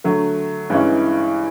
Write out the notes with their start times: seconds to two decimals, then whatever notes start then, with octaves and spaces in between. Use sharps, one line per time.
0.04 D3 F#3 A3
0.70 G2 E3 G#3 C#4 E4